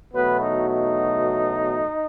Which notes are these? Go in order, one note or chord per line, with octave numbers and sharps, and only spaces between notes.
E2 B2 F#3 A3 B3 B4
D#4
D#4